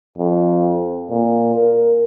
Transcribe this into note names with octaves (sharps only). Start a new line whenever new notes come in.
F2
A#2
A#4